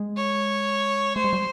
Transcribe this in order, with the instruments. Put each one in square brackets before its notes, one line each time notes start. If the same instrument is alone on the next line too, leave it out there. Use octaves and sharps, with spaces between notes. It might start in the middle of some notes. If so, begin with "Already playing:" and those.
Already playing: [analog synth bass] G#3
[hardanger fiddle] C#5
[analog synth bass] A3 [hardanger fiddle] C5
[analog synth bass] G#3
G3